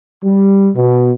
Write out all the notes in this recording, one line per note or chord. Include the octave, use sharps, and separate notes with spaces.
G3
B2